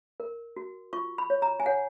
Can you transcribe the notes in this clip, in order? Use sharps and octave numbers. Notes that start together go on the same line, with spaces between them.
A#4
F#4
F4 C#6
B5
C#5
A#5
G#5
C#5 F#5